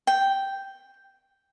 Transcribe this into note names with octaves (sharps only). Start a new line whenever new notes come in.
G5